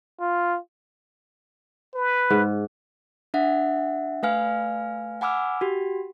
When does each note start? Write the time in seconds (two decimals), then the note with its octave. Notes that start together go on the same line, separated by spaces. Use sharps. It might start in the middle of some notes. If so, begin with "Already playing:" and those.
0.21 F4
1.94 B4
2.30 G#2
3.34 D4 E5 F#5
4.23 A3 B4 F5 G#5 F6
5.21 F#5 G#5 B5 D6 E6 F6
5.61 F#4 G4